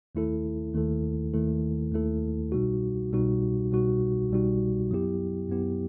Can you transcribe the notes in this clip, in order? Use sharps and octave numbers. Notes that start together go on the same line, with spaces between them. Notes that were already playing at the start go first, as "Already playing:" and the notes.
D#2 D#3 A3 E4 A4
D#2 D#3 A3 E4 A4
D#2 D#3 A3 E4 A4
D#2 D#3 A3 E4 A4
C2 B2 G3 D#4 F#4
C2 B2 G3 D#4 F#4
C2 B2 G3 D#4 F#4
C2 B2 G3 D#4 F#4
F#2 F#3 B3 E4 G4
F#2 F#3 B3 E4 G4